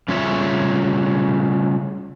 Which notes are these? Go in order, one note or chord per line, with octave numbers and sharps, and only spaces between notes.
C#3 G3 F4 G#4 C#5 E5